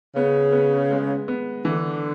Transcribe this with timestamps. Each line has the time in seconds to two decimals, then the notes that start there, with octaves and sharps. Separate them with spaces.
0.16 C#3 B3
0.52 B3
0.91 G#3
1.28 B3
1.65 D3 E3